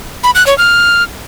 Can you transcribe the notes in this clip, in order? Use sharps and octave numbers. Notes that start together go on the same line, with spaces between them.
B5
F#6
C#5
F6